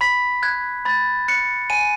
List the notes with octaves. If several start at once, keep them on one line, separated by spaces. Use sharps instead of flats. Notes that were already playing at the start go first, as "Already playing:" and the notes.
B5 B6
F#6 G#6
B5 A6
F#6 C#7
G#5 D#7